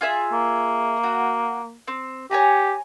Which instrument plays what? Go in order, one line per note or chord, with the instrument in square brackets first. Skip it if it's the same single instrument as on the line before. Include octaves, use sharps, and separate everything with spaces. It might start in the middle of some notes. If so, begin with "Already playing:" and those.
[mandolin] F4 G#4 E5
[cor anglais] A#3
[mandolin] F#4
C4
[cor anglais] G4 [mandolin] C#5 G#5 A#5